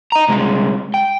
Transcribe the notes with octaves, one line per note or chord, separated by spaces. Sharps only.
D#5 A#5
C2 G#3
G5